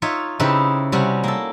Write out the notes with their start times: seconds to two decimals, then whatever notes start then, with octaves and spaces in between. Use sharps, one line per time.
0.02 D#4 F4 C#5 E5
0.39 C#3 C4 D#4 E4 G4 B4
0.92 C3 G3 C#4 F#4
1.24 A#3 A4